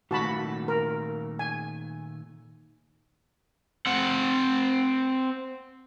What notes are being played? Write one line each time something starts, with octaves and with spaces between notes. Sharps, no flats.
A#2 D#3 A3 F#4 A5 B5
A#4
G#5
C4 F#5